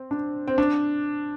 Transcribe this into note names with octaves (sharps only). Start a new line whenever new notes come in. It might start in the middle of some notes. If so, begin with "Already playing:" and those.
Already playing: C4
D4
C4
D4